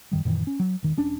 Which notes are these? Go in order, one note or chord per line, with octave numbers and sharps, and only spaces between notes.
F#2 D#3 G3
F#2 A#2 D#3 E3
C#4
F#3
E1 D#3
E1 C#4 D4